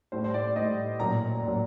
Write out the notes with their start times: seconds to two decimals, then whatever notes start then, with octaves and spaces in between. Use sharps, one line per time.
0.12 A2 G3 C5
0.24 C5
0.34 D5
0.56 A2 G3 D#5
1.00 A#2 F#3 A#5
1.43 A#2 F#3